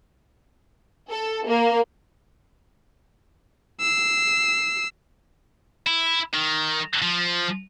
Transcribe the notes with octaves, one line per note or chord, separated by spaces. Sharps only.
A4
A#3
E6 C7
E4
D#3
F3